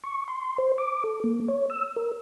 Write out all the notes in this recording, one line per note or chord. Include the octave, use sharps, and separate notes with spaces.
C#6
C6
C5
D6
A4
A#3
C#5
E6
A#4